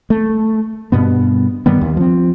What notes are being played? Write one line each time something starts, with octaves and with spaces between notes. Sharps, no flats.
A3
G2 B2 B3
G2 D#3 G3 B3
D#2
F3 C4